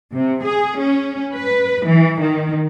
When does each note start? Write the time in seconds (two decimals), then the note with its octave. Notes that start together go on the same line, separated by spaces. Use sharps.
0.12 C3
0.43 G#4
0.79 C#4
1.35 B4
1.85 E3
2.19 D#3